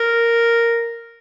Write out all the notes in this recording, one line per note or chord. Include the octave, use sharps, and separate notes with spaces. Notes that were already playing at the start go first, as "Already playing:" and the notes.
Already playing: A#4